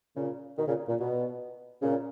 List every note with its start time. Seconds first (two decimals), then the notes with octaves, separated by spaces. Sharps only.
0.16 A#2 C#3
0.57 B2 D#3
0.68 A#2 C#3
0.88 A#2
0.99 B2
1.82 A#2 C#3